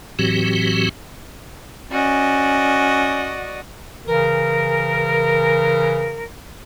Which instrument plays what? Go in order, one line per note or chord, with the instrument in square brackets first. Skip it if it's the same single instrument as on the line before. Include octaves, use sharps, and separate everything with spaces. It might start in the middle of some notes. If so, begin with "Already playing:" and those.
[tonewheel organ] A2 E3 F#3 C4 F#4 G4
[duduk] C#4 [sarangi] F#4 [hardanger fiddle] D5 D#5
[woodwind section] C#3 E3 A#4